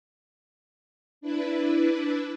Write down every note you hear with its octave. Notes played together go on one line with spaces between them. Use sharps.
D4 E4 B4